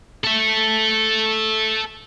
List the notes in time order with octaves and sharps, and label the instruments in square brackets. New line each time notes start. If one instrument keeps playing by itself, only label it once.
[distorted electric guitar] A4 E5